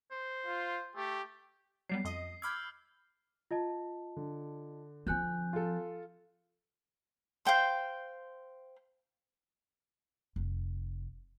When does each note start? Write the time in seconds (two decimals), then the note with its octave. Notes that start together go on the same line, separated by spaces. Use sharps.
0.11 C5
0.46 F4
0.96 A3 G4
1.89 F#3 G3 B3 C7
2.05 F2 D#5 D#6
2.42 B5 D6 E6 F6 G6 G#6
3.51 F4 D#5 A5
4.17 D3
5.07 F3 C4 G#5 F#6 G6
5.53 F4 A4
7.45 C5 F5 G5 C6
10.36 F1